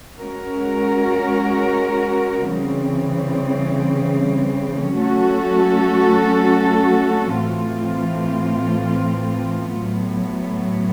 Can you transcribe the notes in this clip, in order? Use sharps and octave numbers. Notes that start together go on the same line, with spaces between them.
G#3 C#4 F#4 A#4
C#3 E3 G3 C4
F#3 A3 C#4 F#4 A4
A2 E3 A3 C4 F4
A2 F#3 B3